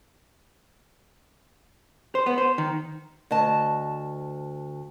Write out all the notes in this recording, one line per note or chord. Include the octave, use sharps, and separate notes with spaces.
C5
B3
C5
D#3
D2 D#5 A5